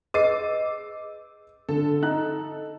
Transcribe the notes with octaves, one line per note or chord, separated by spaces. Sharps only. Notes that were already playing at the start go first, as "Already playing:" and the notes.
G#4 B4 D#5 D6 E6 C7 D#7
D3 A4
D#4 A#5 F#6